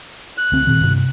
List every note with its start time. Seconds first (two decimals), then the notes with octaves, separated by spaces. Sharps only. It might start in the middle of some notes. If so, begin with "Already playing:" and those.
0.38 F#6
0.52 D2 C4
0.67 A#2 D#3
0.81 G2 C3